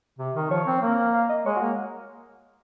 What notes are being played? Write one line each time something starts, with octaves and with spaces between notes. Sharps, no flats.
C3
D#3
F3 C#5
C4
A#3
F5
D#5
G#3 C#5
F#4
A#3